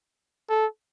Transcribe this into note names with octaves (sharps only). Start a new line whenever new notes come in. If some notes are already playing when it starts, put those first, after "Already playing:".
A4